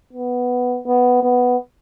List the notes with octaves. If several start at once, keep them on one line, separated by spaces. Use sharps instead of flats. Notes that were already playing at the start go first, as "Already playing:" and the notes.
B3
B3
B3